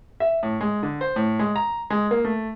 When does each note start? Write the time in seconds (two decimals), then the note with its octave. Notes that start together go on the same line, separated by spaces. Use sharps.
0.20 E5
0.43 A2
0.61 G#3
0.83 D3
1.01 C5
1.16 A2
1.39 G#3
1.56 A#5
1.90 G#3
2.11 A#3
2.25 A3